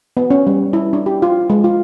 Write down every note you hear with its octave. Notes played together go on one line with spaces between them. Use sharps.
B3
C#4
G3
E4
D4
G4
F4
G#3
F4